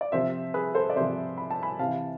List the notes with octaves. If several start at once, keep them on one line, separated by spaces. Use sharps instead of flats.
D5
C3 F3 C5 E5
G#4 B4
A4 C5
D5
C3 F3 C5 E5
B5
A5
G#5 B5
C3 E3 F5 A5